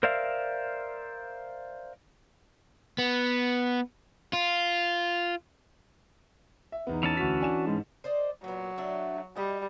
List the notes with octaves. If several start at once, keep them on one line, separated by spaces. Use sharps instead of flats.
A#4 C5 D5 E5 F5
B3
F4
E5
E2 B3 D#4
E3 C#4 A5
D2 F#4 B6
D4 G#5 E7
G#2 G#3
C5 D5 D#5
A#2 F#3 B3
A3 D4 E5
G3 D#5